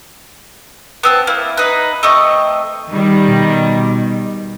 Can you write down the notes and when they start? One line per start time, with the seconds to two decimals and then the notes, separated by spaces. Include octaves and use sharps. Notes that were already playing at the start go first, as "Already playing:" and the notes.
1.03 B3 C4 A5
1.27 A#3 E4
1.57 D#4 B4
2.03 A3 C4 D#5 C#6
2.91 D#3 G3
3.24 B2